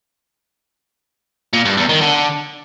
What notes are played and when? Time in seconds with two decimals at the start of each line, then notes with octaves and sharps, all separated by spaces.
1.53 A#2
1.65 G2
1.77 E2
1.89 D#3
2.01 D3